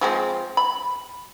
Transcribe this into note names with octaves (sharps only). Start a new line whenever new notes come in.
F3 G#3 C4
B5